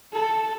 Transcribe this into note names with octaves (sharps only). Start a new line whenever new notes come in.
A4